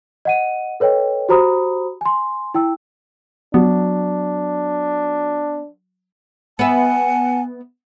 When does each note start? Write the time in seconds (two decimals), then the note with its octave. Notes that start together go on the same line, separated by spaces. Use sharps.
0.25 D#5 F#5 D#7
0.80 A4 B4 C#5 D#5 G5
1.29 F#4 G4 C5 A#5 B5 D#6
2.01 G#5 C6
2.54 E4 G5 E6
3.54 F#3 B3 D4
6.59 B3 E5 F#5 G#5 A5